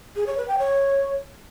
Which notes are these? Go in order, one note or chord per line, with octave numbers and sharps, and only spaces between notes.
G#4
C#5
B4
G5
C#5